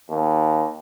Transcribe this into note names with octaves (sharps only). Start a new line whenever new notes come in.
D#2